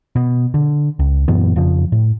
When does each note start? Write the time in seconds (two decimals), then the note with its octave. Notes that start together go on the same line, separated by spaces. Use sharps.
0.16 B2
0.54 D3
0.99 C#2
1.28 F#2 A#2 E3 B3
1.56 F2 C#3 F3
1.92 A2